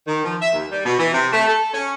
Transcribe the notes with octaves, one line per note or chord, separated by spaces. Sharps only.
D#3
F3
E5
D#2
G3
B2
E3
C3
A3
A4
C#4